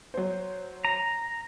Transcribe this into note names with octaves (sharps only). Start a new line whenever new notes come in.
F#3 C5
A#5